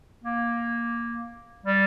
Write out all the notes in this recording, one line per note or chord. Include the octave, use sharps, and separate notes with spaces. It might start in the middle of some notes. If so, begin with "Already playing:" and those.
A#3
G3